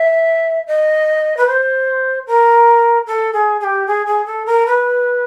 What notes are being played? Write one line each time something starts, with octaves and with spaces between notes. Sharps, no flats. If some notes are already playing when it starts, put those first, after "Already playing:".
Already playing: E5
D#5
B4
C5
A#4
A4
G#4
G#4
G4
G#4
G#4
A4
A#4
B4